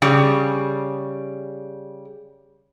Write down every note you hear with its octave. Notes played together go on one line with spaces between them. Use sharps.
C#3 G3